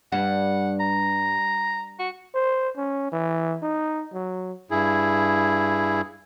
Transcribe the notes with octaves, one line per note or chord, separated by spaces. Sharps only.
G2 F#5
A#5
F#4
C5
C#4
E3
D#4
F#3
G2 E4 G#4